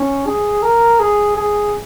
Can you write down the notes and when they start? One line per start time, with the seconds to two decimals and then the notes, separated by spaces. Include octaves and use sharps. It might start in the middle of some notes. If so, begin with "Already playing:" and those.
Already playing: C#4
0.26 G#4
0.62 A#4
0.99 G#4
1.36 G#4